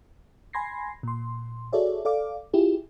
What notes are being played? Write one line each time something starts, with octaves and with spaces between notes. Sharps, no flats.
G#5 B5 C6 G#6 A#6 C7
A#2 C6
F#4 G#4 A4 C#5 D5 E5
A4 D5 F5 D6
E4 F4 G4 G#4